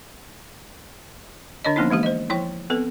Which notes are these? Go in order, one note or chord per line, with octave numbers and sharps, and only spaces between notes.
D3 D4 C#5 D#5
F3 A#3 B3 C#4 D#4 E4
E3 G#3 A#3 G4
C5 D#5
F3 E4 C#5 G5 C#6
B3 C4 A4 B4